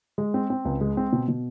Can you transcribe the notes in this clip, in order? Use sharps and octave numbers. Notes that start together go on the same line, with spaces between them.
G#3
C4
C4
C#2
G#3
C4
B2
B2